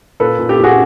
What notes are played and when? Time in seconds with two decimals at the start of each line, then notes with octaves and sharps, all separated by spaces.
0.20 A#2 A4 B4
0.39 A#2
0.49 G4 A4
0.58 A#2
0.64 F#4 G#4